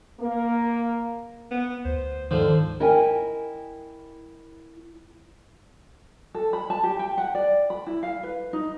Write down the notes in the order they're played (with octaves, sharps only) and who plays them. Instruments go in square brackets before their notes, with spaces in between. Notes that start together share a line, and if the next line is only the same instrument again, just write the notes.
[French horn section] A#3
[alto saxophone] B3
[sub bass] D2 [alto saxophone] C5
[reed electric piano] G#2 D#3 [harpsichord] D3 F3 [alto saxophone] C5
[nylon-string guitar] E4 A#4 D#5 G5 G#5
[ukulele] A4
B5
A5
G4
G5
F#5
D5
B5
E4
F5
B4
D#4